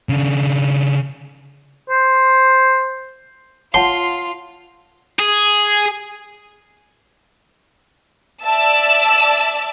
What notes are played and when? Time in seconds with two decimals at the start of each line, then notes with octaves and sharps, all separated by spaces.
0.09 C#3 D4
1.90 C5
3.74 F4 C#5 F#5 A5 C6
5.19 G#4
8.44 D5 E5 A5 E6